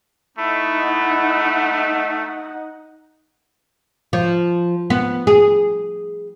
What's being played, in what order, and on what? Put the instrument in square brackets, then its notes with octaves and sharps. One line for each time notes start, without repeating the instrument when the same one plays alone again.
[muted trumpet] A3 [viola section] D#4 F#5 [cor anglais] E4
[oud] F3
B3
G#4